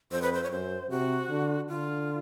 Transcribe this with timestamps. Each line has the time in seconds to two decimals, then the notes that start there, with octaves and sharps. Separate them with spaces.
0.11 F2 C5
0.22 B4
0.33 C5
0.43 C#5
0.51 F#2 C5
0.90 C3 F#4
1.29 D3
1.68 D3 F4